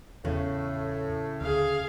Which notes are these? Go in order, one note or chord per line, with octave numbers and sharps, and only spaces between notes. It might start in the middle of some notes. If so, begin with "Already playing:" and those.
E2 A2 C#3
D2 G#4 F5